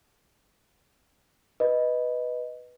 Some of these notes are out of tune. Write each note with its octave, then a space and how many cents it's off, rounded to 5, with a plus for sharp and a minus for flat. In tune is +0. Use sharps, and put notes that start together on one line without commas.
B4 +0 D#5 +0